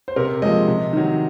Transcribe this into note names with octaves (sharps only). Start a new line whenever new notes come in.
C5
C3 A#4
F3 G#3 D#5
C3
D#3 F#3